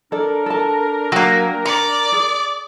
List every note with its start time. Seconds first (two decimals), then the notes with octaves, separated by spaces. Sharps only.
0.12 D4 A4 A#4 D5
0.46 A4 A5
1.12 F#3 A#3 G5
1.65 D5 A#5
2.12 G#4